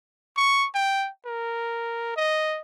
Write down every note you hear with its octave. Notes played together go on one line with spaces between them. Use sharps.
C#6
G5
A#4
D#5